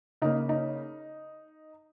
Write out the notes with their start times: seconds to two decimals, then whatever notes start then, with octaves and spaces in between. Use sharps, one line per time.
0.22 C#3 A#3 D#4
0.49 D#4